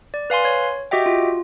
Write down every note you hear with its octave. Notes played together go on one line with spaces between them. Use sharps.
D5
B4 F5 G#5 C6
C#5
F#4 G4 D#5 E5 G5
F4